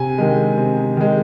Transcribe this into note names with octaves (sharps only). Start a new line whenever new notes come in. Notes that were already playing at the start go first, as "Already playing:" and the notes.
Already playing: C3 G#5
D#3 G#3
C3
D#3 G#3